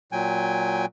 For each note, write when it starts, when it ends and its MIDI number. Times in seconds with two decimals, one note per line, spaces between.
0.12 0.86 46
0.12 0.86 54
0.12 0.86 79
0.12 0.86 80